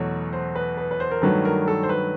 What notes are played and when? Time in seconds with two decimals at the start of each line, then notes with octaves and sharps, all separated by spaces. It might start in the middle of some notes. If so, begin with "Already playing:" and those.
Already playing: E2 B2 F#3 A3 C#5
0.33 C5
0.55 B4
0.77 B4
0.91 B4
1.00 C5
1.11 A#4
1.22 G2 D#3 F#3 A3 B4
1.45 A#4
1.68 A4
1.83 C5
1.89 B4